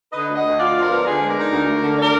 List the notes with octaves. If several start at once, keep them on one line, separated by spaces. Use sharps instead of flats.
D3 B4 D#5
D2
D#5 F#5
D2
F4 D5 F5
F3
A#4 D5
B3
D3 G#4 B4
G#3
A#4 D5
D#4
D2
D2
D3
A#4 D5